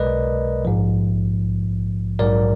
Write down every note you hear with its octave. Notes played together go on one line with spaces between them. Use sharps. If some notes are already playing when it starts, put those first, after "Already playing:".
Already playing: B1 B2 G#3 A#4 B4 D5 D#5
A#1 G#2 F3
A#1 G#2 F#3 A#4 D5